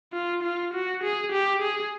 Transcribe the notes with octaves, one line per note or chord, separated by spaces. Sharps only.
F4
F4
F#4
G#4
G4
G#4